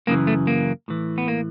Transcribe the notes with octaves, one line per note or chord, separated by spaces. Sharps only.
F#2 C#3 E3 A#3
A3
A#3
A2 E3
B3
A#3